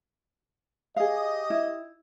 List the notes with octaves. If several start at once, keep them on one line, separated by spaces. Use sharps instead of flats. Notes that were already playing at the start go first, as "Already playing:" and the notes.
G4 G#4 D#5 F5
E4